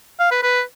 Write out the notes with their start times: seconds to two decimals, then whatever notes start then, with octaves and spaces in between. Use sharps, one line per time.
0.19 F5
0.31 B4
0.43 B4